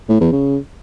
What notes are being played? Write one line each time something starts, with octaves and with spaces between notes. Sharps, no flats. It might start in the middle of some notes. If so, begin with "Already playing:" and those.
A2
E2
C#3